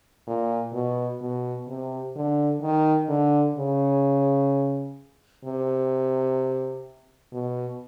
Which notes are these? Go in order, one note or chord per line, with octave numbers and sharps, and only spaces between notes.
A#2
B2
B2
C3
D3
D#3
D3
C#3
C3
B2